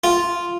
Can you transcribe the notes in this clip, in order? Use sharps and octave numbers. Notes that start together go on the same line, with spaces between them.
F4